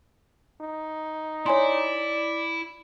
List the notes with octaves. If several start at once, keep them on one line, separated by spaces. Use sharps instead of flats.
D#4
E4 C#5 D5 G#5 C6